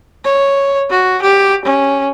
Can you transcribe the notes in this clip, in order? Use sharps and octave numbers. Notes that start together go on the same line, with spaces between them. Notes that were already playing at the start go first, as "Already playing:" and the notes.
C#5
F#4
G4
C#4